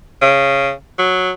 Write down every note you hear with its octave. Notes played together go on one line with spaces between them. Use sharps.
C#3
F#3